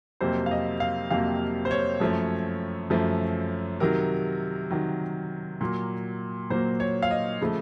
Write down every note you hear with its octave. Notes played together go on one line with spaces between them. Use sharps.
F2 C3 F#3 A#3 C5
F5
D#5
F5
F2 C3 F#3 A#3 F5
C5
C#5
F#2 F3 A3
F#2 F3 A3
C3 D#3 F#3 A#4
C3 D#3 F#3
A#2 F#3 A#3
A#2 F#3 A#3 C5
C#5
F5
D#5
C#3 F3 A3